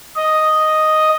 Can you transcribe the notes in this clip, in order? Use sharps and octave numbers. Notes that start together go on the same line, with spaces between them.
D#5